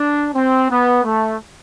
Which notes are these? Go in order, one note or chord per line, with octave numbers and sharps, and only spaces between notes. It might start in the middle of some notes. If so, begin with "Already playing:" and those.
Already playing: D4
C4
B3
A3